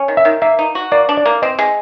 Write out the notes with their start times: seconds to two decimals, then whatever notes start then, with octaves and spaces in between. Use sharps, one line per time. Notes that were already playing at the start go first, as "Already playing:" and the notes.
Already playing: C#4
0.08 D#3
0.17 E5
0.25 D#3
0.42 A#3 E5
0.59 D#4
0.75 F#4
0.92 A#3 D5
1.09 D4
1.17 D5
1.26 A#3
1.42 C4 D#5
1.59 G#3